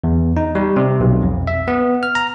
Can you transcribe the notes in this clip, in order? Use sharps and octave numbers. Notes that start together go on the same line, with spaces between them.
E2
D#4
G3
C3
B1
F2
E5
B3
F6
A#5